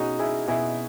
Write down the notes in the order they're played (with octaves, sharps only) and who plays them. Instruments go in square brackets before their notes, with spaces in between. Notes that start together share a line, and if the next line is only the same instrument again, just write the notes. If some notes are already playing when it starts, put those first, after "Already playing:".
Already playing: [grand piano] B2 C#4 D#4 F#4 G#4
E4 G#4
B2 E4 G#4